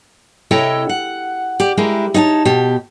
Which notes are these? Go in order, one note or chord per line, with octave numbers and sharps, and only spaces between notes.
C3 E4 A4 C#5 D#5 G5
F#5
G4 D5
G#3 E4 G4 A#4
D#4 C#5 G#5 A5
B2 G4